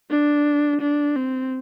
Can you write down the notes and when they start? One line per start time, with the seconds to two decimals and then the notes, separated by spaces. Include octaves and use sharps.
0.10 D4
0.81 D4
1.16 C4